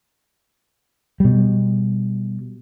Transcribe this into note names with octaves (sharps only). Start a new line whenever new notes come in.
B2 G3